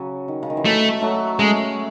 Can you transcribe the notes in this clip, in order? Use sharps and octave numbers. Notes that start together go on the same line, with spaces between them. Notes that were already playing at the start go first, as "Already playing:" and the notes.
Already playing: C#3 F#3
D#3
C#3
D#3
E3
F#3 A3
F#3 A3
G#3 A3 C#4